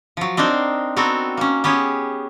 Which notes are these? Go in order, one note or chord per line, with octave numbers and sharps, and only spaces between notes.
F3 F#3
C4 D4 D#4 A#4 C5
B3 C4 F#4 A4 A#4
A#3 C#4
B3 C#4 G4 G#4 C#5